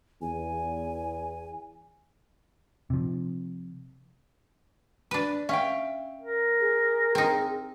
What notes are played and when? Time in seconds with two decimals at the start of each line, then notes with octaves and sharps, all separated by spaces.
0.22 E2 G#5
2.90 C3 F3
5.11 D4 B4
5.49 C#4 E5 F5 G5
6.20 A#4
6.61 G#4
7.15 C4 D#4